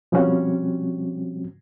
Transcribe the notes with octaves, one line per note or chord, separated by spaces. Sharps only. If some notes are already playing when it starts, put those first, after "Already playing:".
B2 F3 G3 C4 C#4 F#4